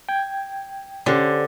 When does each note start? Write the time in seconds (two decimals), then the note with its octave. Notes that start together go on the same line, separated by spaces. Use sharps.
0.09 G5 G#6
1.06 D3 C#4 G4 C5